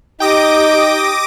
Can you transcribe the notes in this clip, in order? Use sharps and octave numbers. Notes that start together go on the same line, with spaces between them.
D#4 G4 G5 D6 D#6 A#6